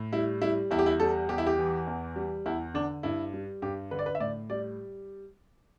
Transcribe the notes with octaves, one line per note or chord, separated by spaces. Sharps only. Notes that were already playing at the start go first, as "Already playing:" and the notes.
Already playing: A2
G3 E4
G3 E4
E2 E4
G4
E4
G3 A4
E2 G4
E4
G4
E3
E2
G3
E2 E4
D3 D4
G2 E4
G3
G2 G4
D3 B4
D5
B4
E5
A2 D5
G3 D5